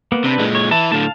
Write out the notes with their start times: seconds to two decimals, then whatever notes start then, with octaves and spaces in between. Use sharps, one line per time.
0.12 A#3 B3
0.24 C3 C4 D4 B4
0.39 A#2 G#3
0.55 C#5
0.71 E3 E4 A5
0.92 A2 D3 F5 A5